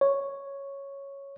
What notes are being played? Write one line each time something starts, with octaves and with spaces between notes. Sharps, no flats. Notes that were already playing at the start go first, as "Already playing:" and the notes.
C#5